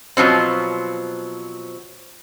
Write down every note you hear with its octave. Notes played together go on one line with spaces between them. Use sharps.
B2 F3 F#3 C4